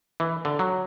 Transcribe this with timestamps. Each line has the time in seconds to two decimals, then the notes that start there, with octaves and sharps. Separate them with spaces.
0.20 E3
0.45 D3
0.59 F#3